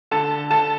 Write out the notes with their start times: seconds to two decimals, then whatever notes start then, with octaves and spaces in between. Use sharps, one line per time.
0.11 D3 A4 A5
0.50 D3 A4 A5